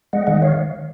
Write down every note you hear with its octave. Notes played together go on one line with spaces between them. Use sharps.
G#3 D#5 F#5
D#3 D#5 F#5
C#5 F5